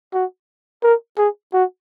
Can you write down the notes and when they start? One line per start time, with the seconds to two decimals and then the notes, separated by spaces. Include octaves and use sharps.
0.14 F#4
0.83 A#4
1.18 G#4
1.53 F#4